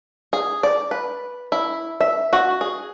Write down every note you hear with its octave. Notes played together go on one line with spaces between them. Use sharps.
G#4
D5
B4
E4
E5
F#4
G#4